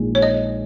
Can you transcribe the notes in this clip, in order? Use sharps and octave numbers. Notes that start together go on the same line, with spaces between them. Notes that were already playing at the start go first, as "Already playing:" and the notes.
Already playing: A#1 A#2 G#3 D#4
C#5
D#5